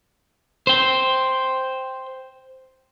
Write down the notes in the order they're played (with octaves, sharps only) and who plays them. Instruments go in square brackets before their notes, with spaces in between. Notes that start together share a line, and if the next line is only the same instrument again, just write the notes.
[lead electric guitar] C5 G5